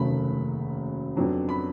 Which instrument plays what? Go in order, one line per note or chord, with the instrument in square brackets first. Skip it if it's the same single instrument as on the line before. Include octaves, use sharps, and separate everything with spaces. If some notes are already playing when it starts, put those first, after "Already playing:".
Already playing: [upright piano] F1 D#2 C#3 F#3 A3 B5
F2 C#3 F#3 B3 D4
B5